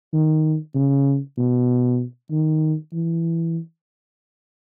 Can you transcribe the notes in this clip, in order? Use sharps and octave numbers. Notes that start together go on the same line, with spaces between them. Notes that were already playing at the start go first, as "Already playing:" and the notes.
D#3
C#3
B2
D#3
E3